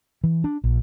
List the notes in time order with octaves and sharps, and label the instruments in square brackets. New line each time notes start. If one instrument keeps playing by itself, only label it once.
[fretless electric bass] E3
D4
A#1